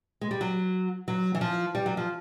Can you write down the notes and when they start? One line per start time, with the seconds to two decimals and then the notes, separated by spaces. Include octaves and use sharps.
0.21 G#3
0.31 G3
0.41 F#3
1.08 F#3
1.35 E3
1.41 F3
1.75 G3
1.86 F#3
1.97 F3